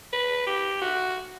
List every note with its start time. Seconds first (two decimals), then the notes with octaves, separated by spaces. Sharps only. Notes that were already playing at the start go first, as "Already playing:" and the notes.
0.13 B4
0.47 G4
0.82 F#4